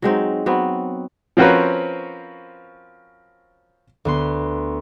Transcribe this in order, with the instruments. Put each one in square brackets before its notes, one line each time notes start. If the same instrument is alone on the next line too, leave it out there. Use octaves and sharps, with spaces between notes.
[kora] F#3 G#3 C4 D#4
F#3 B3 C4
[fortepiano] F3 C4 C#4 F#4 A#4 B4
[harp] D2 B3 C6